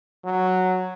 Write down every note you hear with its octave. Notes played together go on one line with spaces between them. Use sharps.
F#3